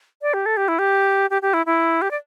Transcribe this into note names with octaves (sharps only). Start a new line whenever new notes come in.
D5
G4
A4
G4
E4
G4
G4
G4
E4
E4
G4
D5